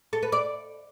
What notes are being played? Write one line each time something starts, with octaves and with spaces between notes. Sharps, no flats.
A4
B4
D5